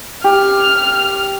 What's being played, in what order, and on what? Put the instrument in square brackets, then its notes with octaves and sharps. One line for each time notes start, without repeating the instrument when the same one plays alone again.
[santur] G4 [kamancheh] F6